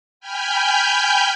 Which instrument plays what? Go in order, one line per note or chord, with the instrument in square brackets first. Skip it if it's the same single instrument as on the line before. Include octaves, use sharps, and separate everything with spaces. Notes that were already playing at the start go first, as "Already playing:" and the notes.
[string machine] G5 G#5 B5 F6 G6